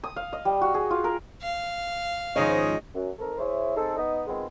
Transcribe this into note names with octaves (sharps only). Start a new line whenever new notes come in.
D#6
F5
D#5
G3
F#4
G#4
F4
A#4
F5
G#2 D#3 F3 G#3 C#4 D#4 D#5
F#2
D#3 C4 A4 A#4
E4 G#4 C5 C#5 E5
C4 D#4 G#4 A4
B3 D#4 D#5
D#3 F3 G#3 B3 C4